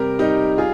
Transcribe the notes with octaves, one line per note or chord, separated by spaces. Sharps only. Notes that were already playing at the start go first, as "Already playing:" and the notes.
Already playing: C3 G3 G4 A#4
G3 D#4 G4
F4 G#4